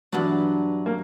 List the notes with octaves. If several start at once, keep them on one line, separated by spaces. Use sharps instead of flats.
G2 E3 F#3 B3 D4
A#3